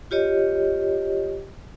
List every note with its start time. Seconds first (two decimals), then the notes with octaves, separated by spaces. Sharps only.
0.11 F4 G4 C#5 D#5